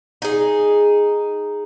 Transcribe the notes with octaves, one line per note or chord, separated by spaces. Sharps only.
D#4 G#4